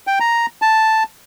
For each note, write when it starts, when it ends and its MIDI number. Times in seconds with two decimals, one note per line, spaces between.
0.07 0.19 79
0.20 0.46 82
0.62 1.03 81